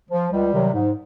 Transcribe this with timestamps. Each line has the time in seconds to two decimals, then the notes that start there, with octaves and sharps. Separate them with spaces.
0.10 F3
0.31 C#2 G3
0.51 C3 D#3 F#3
0.73 G#2